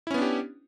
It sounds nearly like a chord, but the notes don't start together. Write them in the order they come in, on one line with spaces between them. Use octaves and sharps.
E4 C#4 B3 D4 G4